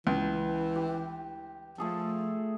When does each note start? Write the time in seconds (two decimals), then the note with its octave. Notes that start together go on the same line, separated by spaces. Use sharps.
0.07 C#2 E3
0.75 G4
1.78 F3 A3 G#4 A4